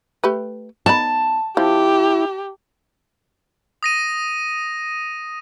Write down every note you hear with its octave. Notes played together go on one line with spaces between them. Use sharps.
A3 G4 B4
B3 D#4 A5 B5
F3 C4 E4 G4
D#6 A#6 D#7